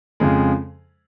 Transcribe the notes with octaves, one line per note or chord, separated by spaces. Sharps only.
F2 C#3 F3 G#3